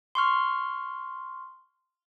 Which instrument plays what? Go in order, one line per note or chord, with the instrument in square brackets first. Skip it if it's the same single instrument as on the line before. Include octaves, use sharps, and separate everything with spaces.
[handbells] C6 C#6 F6